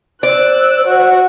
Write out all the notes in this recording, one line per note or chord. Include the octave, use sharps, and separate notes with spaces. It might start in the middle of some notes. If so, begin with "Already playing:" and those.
C5 D5 E6 F#6
F#4